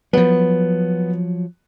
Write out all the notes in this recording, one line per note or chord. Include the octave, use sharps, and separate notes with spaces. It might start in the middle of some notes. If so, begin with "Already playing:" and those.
F3 F#3 B3